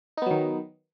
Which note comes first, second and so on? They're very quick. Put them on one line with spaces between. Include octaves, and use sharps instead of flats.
D#4 B3 F#3 D#3